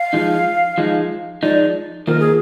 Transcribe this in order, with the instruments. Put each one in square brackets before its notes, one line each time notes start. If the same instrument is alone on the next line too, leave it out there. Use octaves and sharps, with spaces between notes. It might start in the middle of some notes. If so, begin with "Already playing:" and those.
Already playing: [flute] F5
[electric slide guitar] F3 G#3 D#4
F3 G#3 D#4
[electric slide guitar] F3 G#3 D#4 [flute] D5
[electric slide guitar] D#3 A#3 F4 C5 [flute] A#4
[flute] G#4